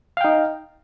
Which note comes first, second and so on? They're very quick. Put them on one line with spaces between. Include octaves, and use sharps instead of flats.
F5 G5 D#4